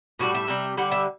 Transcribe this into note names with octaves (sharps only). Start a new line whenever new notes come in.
A2 E3 G3 F#4
E5
C3 G3
D3 G3 F#5
E5